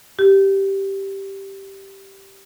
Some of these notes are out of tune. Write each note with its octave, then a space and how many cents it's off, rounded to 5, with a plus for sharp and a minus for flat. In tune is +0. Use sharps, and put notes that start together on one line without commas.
G4 -5